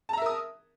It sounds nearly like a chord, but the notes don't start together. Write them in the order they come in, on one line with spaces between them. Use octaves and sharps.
A5 A#5 E5 A#4 D#6